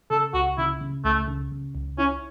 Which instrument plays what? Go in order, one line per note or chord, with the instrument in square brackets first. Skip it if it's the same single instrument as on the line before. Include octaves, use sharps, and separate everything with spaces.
[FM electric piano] C#3 [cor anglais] A4
[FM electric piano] C#2 [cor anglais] F#4
[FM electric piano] C#3 [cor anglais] E4
[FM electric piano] C#3
[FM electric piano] C#2 [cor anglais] A3
[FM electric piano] C#3
C#3
C#2
[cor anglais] C#4 [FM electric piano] E4